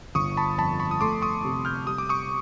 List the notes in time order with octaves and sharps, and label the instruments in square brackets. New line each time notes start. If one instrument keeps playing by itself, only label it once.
[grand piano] G1 [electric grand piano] C#6 D#6
[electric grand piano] A5 B5
[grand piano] F2 [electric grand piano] A5 B5
[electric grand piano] B5 C#6
D#6
[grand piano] A3 [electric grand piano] C6 D6
[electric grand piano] C#6 D#6
[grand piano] C3
[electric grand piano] F6 G6
[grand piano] G3 [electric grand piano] D#6
[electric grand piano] D6
C#6 D#6